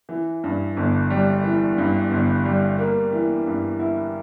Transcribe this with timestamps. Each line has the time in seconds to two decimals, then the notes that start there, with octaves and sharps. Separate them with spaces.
0.09 E3
0.44 G2
0.77 G1
1.10 G3
1.44 E3
1.78 G2
2.11 G1
2.45 G3
2.79 A#3
3.12 E3
3.46 G2
3.79 E4